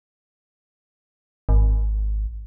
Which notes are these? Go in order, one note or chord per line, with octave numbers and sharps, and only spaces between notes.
G#1